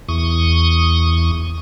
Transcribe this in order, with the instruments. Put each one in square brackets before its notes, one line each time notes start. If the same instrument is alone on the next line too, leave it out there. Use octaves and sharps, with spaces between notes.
[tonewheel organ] E2 C#6 D#6